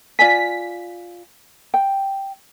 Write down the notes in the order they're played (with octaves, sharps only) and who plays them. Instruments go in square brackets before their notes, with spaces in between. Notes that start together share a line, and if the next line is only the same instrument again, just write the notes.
[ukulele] F4 D5 G#5 [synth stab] B6
[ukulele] G5